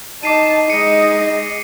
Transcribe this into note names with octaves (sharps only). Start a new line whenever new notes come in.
D#4 A5 D6 C7 D#7
G#3 D#4 D#5 C#7 D#7